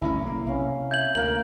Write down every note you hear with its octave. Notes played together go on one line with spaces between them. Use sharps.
G1 D2 C#4 E4 A#5
B1 A#3
C3 C#4 F5
E5 G6 G#6 F#7
D2 A#3 A#4 F5 F#7